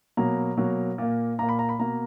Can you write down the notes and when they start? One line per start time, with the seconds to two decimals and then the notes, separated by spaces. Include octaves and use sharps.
0.17 B2 F#3 A#3 A#5
0.57 B2 F#3 A#3
0.98 A#2 A#3
1.39 A#2 A#5
1.43 A#3
1.49 B5
1.59 A#5
1.69 B5
1.79 B2 A#3 A#5